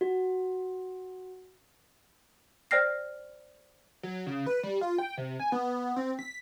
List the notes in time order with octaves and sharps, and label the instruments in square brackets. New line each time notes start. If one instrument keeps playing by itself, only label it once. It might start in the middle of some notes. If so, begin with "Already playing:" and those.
[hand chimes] F#4
[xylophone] C5 D5 G5 F6 A#6 C7
[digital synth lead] F#3
C#3
B4
G3
F4
G5
C3
G#5
B3
C4
B6